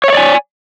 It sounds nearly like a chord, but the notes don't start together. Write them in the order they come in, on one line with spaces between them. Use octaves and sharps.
C#5 E5 D5 G#5